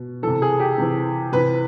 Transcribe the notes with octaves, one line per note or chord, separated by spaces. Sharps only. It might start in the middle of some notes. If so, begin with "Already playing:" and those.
Already playing: B2
C3 E3 A4
G#4
G4
C3 E3
C3 E3 B4